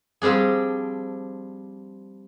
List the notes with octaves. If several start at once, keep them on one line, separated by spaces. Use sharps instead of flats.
F3 G3 C4 D4 G#4